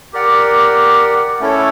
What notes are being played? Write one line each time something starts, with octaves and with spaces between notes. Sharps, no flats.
G4 A#4 D5 F#5
A3 C#4 E4 A4 C#5